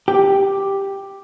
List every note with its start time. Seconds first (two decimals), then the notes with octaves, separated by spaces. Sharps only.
0.08 G4